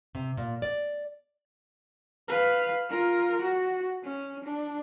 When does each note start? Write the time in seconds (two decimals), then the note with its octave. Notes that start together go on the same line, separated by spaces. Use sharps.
0.15 C3
0.37 A#2
0.62 D5
2.28 B4 F5
2.89 F4 A#4
3.42 F#4
4.03 C#4
4.44 D4